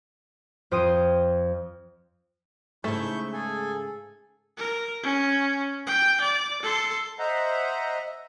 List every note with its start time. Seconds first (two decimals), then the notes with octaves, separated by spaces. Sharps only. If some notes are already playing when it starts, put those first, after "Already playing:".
0.71 F2 C5 G5 D#6 D#7
2.84 G#2 C#3 A3 E4 C#6 G6
3.33 G#4 A4 G#5
4.58 A#4
5.03 C#4
5.86 G5
6.21 D5
6.62 A4 C6
7.19 C5 D#5 E5 F#5 A#5